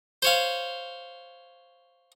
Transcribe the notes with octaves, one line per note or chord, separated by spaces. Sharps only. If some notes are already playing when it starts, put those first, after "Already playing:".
C5 C#5 F5